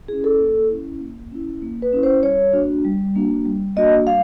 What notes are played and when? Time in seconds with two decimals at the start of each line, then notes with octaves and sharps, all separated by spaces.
0.08 C#4 E4 G#4
0.24 A4
0.40 A#3
0.69 C#4 E4
1.00 A#3
1.31 C#4 E4
1.62 A#3
1.82 B4
1.93 C#4 E4
2.03 C5
2.23 G3 C#5
2.53 A#3 D4 F#4
2.85 G3
3.16 A#3 D4 F#4
3.45 G3
3.76 A#3 D4 F#4 D#5
4.06 G3 F5